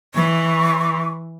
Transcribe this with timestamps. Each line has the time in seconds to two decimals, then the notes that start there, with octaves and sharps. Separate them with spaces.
0.15 E3 C#6